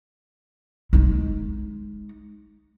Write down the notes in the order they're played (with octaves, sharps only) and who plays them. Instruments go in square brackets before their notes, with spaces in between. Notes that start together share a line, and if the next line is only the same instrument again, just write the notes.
[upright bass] G#3 D#4